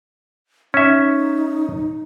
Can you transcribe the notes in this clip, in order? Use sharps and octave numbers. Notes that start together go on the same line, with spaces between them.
C#4 D#4 E5